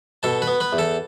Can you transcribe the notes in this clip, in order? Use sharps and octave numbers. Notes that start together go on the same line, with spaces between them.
B2 A4 A5
B4 B5
B3
B4 B5
E2
A4 A5